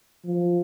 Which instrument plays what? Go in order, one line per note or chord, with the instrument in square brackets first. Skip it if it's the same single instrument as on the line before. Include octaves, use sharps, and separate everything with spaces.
[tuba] F3